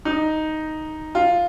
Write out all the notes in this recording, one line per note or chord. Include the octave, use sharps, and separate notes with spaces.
D#4
F4